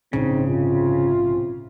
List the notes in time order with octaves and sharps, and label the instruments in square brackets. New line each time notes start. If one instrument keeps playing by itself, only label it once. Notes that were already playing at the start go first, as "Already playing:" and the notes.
[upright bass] A#1 G#2 [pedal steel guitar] C#3 [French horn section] C4 D#4
[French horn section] C3 F4